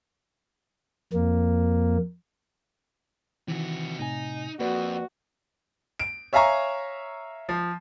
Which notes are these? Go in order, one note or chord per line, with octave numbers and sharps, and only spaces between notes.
F2 A#3
C3 D#3 E3 F#4
A2 C3 D#4 G#5
F2 A#3 F#4 B4 D5
D7
C#5 E5 F5 G#5 A#5 C#6
F3